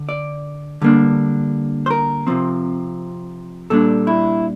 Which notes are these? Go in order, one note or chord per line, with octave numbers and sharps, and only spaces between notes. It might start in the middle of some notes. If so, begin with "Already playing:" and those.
Already playing: D3
D5
D3 G3 A#3 D4
C5
A#4
C3 F3 C4
A#2 G3 D4 A4
E4